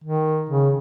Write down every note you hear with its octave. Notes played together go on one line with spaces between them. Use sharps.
D#3
C#3